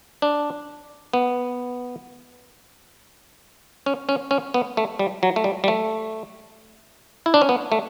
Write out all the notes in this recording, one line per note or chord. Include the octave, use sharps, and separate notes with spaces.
D4
B3
C#4
C#4
C#4
B3
A3
G3
F#3
A3
G3
G3
A3
E4
D4
C#4
B3
A3